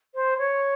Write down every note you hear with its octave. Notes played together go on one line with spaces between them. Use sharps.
C5
C#5